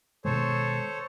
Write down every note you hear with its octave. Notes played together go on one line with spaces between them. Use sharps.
B2 D#3 G#3 A4 C5 C#5